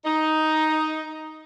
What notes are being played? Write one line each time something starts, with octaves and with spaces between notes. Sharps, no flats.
D#4